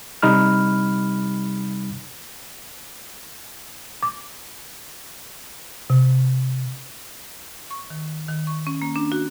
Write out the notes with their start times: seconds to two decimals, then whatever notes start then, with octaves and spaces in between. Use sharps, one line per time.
0.23 C3 G3 D#4 B5 F6
4.03 D6
5.90 C3
7.71 C#6
7.90 D#3
8.28 D#3
8.47 C#6
8.67 C#4
8.82 A#3
8.96 D4
9.12 F#4